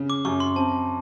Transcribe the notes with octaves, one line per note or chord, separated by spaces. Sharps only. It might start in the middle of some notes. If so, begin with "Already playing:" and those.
Already playing: C#3
D6
F#2 C#6
C6
C4 A5